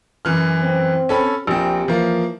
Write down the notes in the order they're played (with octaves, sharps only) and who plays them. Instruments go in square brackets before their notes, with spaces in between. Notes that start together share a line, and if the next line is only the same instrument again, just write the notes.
[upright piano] F#2 E3 F6
[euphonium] C4
[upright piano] C#4 A4 B5
[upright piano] A#1 C4 [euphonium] G4
[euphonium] E3 [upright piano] F3 A#3